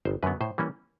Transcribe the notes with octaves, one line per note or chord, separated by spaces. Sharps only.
G1 C5
F#2 D3 F#3 B3 B4
A2 C5
E3 G3 A#3 C#4